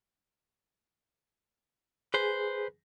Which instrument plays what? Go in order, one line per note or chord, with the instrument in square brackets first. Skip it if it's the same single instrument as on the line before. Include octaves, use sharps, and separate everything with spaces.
[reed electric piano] G#4 [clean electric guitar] B4 C5